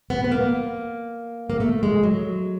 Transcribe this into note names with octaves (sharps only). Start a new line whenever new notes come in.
B3
B3
A#3
A#3
A3
G#3
F#3